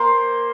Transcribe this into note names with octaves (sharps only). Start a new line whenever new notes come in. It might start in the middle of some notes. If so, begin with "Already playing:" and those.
Already playing: A#3 C5